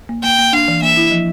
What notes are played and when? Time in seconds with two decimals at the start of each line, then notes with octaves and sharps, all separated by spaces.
0.09 A#3
0.23 A#3 G5
0.39 A#3
0.53 D4 F5
0.68 E3
0.82 A#3 E5
0.97 E4
1.11 F3